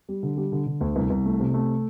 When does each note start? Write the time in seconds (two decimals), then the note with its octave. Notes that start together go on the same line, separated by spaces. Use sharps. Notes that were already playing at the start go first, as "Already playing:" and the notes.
0.09 G3
0.23 D3
0.37 G3
0.52 D3
0.66 D3
0.81 D2
0.96 C2
1.10 C2
1.25 A3
1.40 C3
1.54 A3